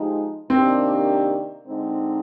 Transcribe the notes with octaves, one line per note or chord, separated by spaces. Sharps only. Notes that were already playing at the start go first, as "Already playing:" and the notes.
Already playing: F3 G#3 D#4 G4
C3 D#3 A#3 C4 D4 G4
D3 G#3 C4 D#4